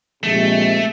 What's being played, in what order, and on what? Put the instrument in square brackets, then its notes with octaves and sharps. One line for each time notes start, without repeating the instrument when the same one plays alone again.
[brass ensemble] A#1 C3 G#3 [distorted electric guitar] A3